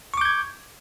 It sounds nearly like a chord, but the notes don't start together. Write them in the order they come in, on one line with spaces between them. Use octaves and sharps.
C#6 D6 G6 G#6